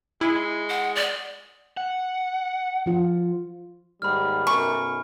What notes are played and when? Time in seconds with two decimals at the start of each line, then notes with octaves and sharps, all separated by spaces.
0.21 G#3 E4
0.70 F#5
0.96 D5
1.77 F#5
2.86 F3 F4
4.02 D#2 G#2 G3 B5 F6
4.47 B1 F#2 A#4 G#5 C#6